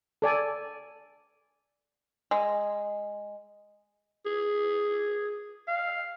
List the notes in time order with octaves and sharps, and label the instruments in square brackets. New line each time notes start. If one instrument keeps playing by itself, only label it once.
[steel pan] A4 D5 G#5
[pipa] G#3
[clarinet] G#4
F5